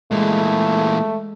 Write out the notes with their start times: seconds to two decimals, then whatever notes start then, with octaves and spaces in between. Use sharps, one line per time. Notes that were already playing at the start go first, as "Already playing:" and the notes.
0.11 A#2 E3 G#3 A3